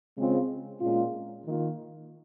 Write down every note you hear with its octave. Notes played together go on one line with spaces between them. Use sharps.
C#3 G#3 C4 F4
A#2 G#3 C#4 F4
D#3 A#3 F4